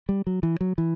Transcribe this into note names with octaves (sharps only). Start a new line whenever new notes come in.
G3
F#3
E3
F#3
E3